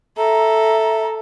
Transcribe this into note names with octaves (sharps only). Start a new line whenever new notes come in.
A4 E5 A#5